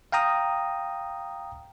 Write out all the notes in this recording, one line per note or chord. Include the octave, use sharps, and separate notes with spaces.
F5 G5 A#5 D#6